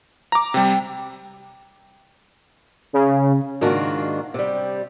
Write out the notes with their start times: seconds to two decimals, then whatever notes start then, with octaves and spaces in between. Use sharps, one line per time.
0.32 A#5 D6
0.54 C3 G3 G5
2.93 C#3
3.61 G#2 D#3 A#3 D4 F4 F#4
4.34 C3 G3